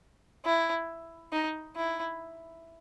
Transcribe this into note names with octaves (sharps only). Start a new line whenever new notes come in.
E4
D#4
E4